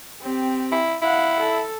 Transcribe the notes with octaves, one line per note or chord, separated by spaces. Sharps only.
C4 G4
E4
E4 F5 F#5
A4